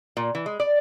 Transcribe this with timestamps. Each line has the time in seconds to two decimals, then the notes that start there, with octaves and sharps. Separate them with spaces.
0.17 A#2
0.35 E3
0.46 G#3
0.60 D5